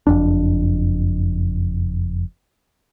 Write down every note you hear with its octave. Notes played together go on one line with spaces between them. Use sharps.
F#1 F2 D4